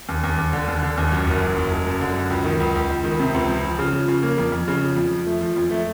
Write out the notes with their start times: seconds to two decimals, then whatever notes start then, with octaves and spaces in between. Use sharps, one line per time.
0.09 D#2
0.23 D#2
0.38 D#2
0.53 D3
0.68 D#2
0.83 D3
0.98 D#2
1.12 F#2
1.27 F#1
1.42 F#2
1.57 F#1
1.71 F#1
1.86 F#2
2.01 D3
2.16 F#2
2.30 C#2
2.45 D#3
2.60 C#2
2.75 C#2
2.89 C#2
3.04 D#3
3.19 C3
3.34 C#2
3.49 F3
3.64 F3
3.79 C#3
3.93 F3
4.08 C#3
4.23 A#3
4.38 F2
4.52 F2
4.68 C#3
4.82 F3
4.96 F2
5.11 F3
5.27 A3
5.41 F3
5.56 F2
5.71 A3